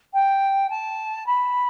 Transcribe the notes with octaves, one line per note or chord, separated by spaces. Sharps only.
G5
A5
B5